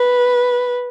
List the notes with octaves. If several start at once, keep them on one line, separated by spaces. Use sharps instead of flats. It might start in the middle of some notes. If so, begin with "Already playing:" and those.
Already playing: B4